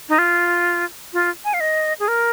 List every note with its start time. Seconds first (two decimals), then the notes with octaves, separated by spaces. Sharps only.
0.09 D#4
0.18 F4
1.13 F4
1.45 G#5
1.54 F5
1.60 D#5
1.99 G#4
2.08 A#4